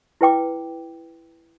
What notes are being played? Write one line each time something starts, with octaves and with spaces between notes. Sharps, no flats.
E4 B4 G5 D6